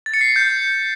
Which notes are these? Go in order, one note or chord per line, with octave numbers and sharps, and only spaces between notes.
A6
C#7
C7
C#7
G6